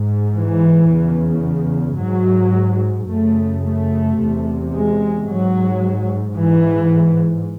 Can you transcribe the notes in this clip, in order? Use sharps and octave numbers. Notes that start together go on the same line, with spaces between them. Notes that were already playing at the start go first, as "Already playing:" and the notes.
Already playing: G#2
E3
E2 C#3
G#2 F#3
F#2 C#3 A3
A3
E2 C3
G#3
G#2 F#3
G#2 E3